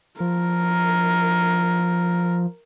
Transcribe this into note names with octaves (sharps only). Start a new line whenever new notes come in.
F3 A#4